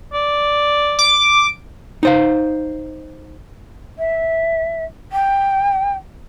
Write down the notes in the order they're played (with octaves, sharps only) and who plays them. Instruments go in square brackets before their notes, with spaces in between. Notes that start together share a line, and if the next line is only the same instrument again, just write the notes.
[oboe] D5
[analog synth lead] D6
[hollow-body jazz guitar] D#4 C5 F5
[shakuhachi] E5
G5